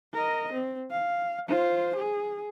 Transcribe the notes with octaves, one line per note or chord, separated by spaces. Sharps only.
A#4 D#5
C4
F5
F4 C5
G#4